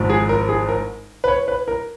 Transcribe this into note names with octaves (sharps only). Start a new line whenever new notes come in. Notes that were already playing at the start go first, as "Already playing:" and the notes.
Already playing: G#1 G#2 F3
G#4
A#4
G#4
A#4
B4
C#5
B4
A#4